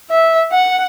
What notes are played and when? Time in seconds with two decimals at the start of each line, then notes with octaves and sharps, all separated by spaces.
0.10 E5
0.52 F#5